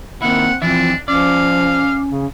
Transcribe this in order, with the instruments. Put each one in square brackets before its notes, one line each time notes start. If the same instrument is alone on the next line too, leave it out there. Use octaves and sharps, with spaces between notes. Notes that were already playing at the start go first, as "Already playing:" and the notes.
[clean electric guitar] D#3 E4 [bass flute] A#3 [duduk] C4 [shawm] F#5
[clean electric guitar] F2 E3 E5 [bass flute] F3 [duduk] C4 [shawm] D4
[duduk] F3 [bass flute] C#4 [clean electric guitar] D5 [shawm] F5
[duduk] C#3